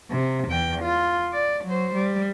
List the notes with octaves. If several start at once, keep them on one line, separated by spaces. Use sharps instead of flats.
C3
E2 G5
F4
D5
F#3 C5
G3